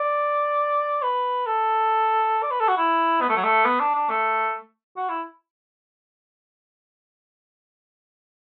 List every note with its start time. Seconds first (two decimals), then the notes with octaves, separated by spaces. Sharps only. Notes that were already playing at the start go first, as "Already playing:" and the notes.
Already playing: D5
1.03 B4
1.47 A4
2.43 D5
2.51 B4
2.61 A4
2.69 F#4
2.78 E4
3.22 B3
3.29 A3
3.37 F#3
3.44 A3
3.66 B3
3.80 D4
3.95 D4
4.10 A3
4.97 F#4
5.09 E4